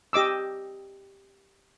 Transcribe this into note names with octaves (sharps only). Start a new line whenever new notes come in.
G4 D#5 D6 E6